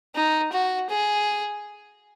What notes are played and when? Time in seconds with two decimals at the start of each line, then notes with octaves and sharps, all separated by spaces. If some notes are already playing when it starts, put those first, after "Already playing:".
0.15 D#4
0.52 F#4
0.89 G#4